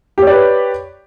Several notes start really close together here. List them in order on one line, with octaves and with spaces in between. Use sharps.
G4 C#5 D5 B4